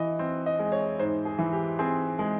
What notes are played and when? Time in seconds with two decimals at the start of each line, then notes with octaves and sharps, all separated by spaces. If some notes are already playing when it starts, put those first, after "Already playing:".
Already playing: E3 D#5
0.19 C4
0.46 D#5
0.59 G#3
0.72 C#5
0.99 G#2 C5
1.25 G#4
1.39 E3
1.52 G4
1.79 C4 G#4
2.19 G#3 G#4